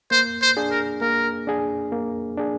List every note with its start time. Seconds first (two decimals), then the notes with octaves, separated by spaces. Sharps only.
0.11 A#3 C5
0.42 C5
0.57 D4 G#4
0.71 A#4
1.01 A#3 A#4
1.47 D4 G#4
1.92 A#3
2.37 D4 G#4